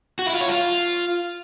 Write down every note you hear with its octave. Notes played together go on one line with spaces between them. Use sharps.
F#4
E4
F4
C#5
F4